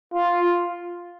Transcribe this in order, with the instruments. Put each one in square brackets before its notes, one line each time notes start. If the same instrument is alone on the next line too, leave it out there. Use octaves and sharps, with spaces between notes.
[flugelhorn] F4